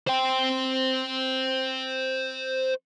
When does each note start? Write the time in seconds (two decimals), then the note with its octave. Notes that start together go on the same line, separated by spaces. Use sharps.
0.08 C5 G5